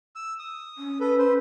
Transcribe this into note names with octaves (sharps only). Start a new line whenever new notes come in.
E6
D#6
C#4
A4 B4
B4 C5